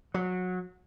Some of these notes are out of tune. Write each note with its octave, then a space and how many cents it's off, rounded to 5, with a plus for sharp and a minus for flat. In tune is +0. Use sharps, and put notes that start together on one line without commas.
F#3 -20